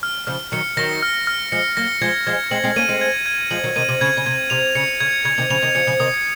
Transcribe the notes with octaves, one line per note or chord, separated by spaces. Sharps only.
F6
C#3 F3 F6
D#3 F#3 C#7
D#3 F#3 A#6
F6
F6
F3 G#3 C#7
F#3 A#3 A#6
F3 G#3 G#6
F3 G#3 G#6
G#3 C4 F#7
G#3 C4
A#3 C#4 D#7
G#3 C4
G#6
G#6
F3 G#3 F#7
D#3 F#3
C3 D#3 D#7
C3
C#3 G#6
C#3
C3 G#6
C3 F7
C#3 C#7
C#3 G#6
C#3 G#6
C3 D#3
C#3 F3 F7
C3 D#3
C#3 F3 C#7
C#3 F3
C3 D#3 D#6